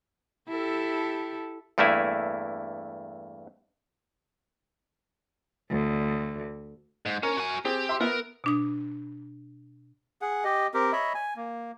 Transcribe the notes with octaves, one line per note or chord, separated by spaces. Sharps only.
E4 G4 A4
E2 G2 A3 A#3 E4 G#5
D2
G#2
C#4 A#4
F#4 G#5
C4 G4 G#4
E5 C6
B3 A#4 E5
B2 D4 D#6
G#4 F#5
G4 D#5
C4 G4 A#4
C#5 D#5 E5 B5
G#5
A#3